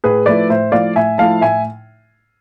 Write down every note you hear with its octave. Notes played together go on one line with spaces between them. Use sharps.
A2 G#4 B4
F3 A3 E4 B4 D5
A2 C5 E5
F3 A3 E4 D5 F5
A2 E5 G#5
F3 A3 E4 F5 A5
A2 E5 G#5